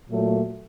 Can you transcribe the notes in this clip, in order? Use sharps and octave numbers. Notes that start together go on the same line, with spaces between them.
A#2 F#3 A3